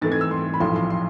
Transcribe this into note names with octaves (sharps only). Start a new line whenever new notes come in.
G#2 E3 A3 C4 A6
G#6
E6
C6
B5
B1 A2 F3 C6
C6
C6